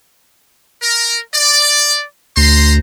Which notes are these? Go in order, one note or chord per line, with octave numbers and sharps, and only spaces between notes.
A#4
D5
D2 C5 A#5 C6